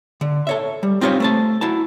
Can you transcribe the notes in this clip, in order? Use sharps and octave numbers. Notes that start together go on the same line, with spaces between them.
D3
A4 C#5 E5
G3
C4 D#4 F4 G4 A4 C#5
A3 C5 A5
E4 F#4 A5